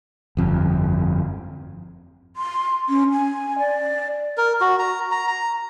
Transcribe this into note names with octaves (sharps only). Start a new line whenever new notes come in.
G1 F2
C6
C#4
G#5
D5
A#4
F#4
A#5
A#5
A#5